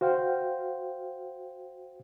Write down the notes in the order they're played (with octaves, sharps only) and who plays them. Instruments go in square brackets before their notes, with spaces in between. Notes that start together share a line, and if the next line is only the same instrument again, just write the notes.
[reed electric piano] F#4 C5 F5 G5